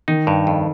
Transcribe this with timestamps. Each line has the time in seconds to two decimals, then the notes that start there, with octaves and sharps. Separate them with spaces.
0.08 D#3 D#4
0.27 G2
0.47 F2